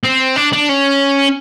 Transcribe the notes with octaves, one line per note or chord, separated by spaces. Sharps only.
C4
D4
D4
C#4